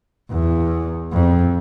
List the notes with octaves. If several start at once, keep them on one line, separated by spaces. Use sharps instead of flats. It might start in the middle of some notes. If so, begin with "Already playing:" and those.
E2
F2